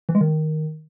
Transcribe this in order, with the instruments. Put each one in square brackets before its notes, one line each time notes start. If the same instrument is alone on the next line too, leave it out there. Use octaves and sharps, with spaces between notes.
[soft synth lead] E3
G#3
D#3